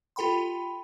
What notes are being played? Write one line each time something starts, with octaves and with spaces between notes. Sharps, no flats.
F4 G4 A4 G5 B5 C6